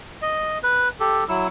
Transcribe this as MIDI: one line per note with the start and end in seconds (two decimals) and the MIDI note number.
0.22 0.58 75
0.63 0.89 71
1.00 1.24 67
1.00 1.24 69
1.29 1.48 54
1.29 1.48 64
1.29 1.48 88